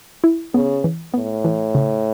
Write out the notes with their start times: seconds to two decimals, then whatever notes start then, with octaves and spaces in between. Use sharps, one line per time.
0.24 E4
0.54 C#3 B3
0.84 E3
1.14 A2 B3
1.45 E3
1.75 C#3